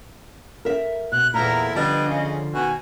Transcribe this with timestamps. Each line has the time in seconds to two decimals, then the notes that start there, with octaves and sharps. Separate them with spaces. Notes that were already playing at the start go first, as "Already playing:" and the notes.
0.65 A#4 E5
1.12 B2 F#6
1.34 E2 A#2 E4 A4 A#4 A#5
1.75 D3 F3 G3 B3 D4 D#5
2.07 C#3
2.53 B2 D#3 F#4 G#5